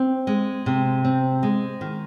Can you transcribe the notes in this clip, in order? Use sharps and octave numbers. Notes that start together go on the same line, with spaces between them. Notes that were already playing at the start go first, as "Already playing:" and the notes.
Already playing: C4
G#3
C3
C4
G#3
D#3